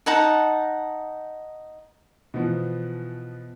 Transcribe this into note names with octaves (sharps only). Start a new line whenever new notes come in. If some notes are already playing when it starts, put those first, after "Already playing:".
D#4 F#5 A5
B2 E3 F3 B3